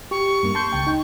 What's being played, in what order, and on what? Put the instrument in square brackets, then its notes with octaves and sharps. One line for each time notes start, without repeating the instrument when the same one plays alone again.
[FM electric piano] G4 [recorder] C#6
[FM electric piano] G2 A#3
A5 C6 G6
C#2 G5
D#4 G5